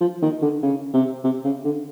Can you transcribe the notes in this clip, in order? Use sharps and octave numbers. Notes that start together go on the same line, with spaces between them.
F3
D#3
D3
C#3
C3
C3
C#3
D3